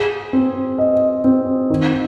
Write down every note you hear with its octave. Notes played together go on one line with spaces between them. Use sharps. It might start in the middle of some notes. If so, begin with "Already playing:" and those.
Already playing: G#4
C4
D#5
C4
D#3